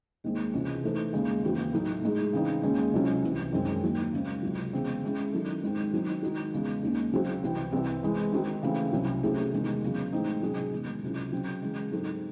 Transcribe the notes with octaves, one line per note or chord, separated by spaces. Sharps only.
D#2 D#3 G#3 C4
C#2 C3 E3 G#3 C#4
E3 A3 D#4 A4 C5
D#2 C#3 G#3
D#2 C#3 E3 C4 F#4
A2 F#3 A3 D#4
A2 G#3 D#4 G#4
C#3 E3 C4 D#4
D#2 C#3 G#3 C#4
C#2 C3 F#3 C#4
C2 C3 E3
F#2 D#3 G#3 C4 D#4
D#2 D#3 F#3
C#3 G#3 C4
C#2 C3 F#3
E2 C#3 G#3 C4
C#3 G#3 C#4 E4 G#4
D#3 F#3 C#4 E4 A4
G#2 D#3 G#3 C4 D#4
D#3 F#3 C4 D#4
D#3 G#3 D#4 F#4
E2 C#3 G#3
D#2 D#3 G#3 C#4
C#3 F#3 C4 F#4 C5
C2 C3 E3 C4
C2 C3 E3 C4
E3 G#3 C4
D#3 G#3 C4 D#4 F#4
C#3 E3 A3 C4
C2 C3 F#3 C#4 E4
C3 F#3 A3 C#4 G#4
E2 C3 D#3 G#3
E2 C#3 F#3
A2 E3 G#3 C4 D#4
C3 F#3 C#4 G#4
E2 D#3 G#3
C#2 C3 F#3 C#4 E4
C#3 F#3 C4
C#3 E3 G#3
G#2 F#3 C4 D#4 A4